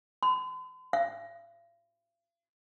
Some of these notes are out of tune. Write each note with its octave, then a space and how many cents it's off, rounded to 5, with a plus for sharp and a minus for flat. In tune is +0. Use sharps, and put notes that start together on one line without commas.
C6 -45
F5 -40